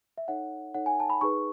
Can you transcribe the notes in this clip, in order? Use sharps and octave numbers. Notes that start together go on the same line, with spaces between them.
E5
D#4 A4 C#5 F#5
D#4 A4 C#5 F#5
G#5
A5
B5
D#4 G#4 B4 C#6